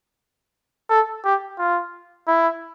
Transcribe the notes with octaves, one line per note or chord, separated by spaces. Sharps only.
A4
G4
F4
E4